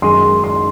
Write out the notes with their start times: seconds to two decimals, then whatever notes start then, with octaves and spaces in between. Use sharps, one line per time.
0.02 F#2 D#3 G#3 D#4 G#4 C6
0.44 C6